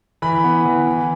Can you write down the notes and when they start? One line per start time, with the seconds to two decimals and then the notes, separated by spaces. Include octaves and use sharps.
0.22 E3 B5
0.44 B3
0.66 E3
0.87 E3